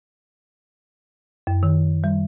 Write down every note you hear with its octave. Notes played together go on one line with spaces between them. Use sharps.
F#2
D#3
G3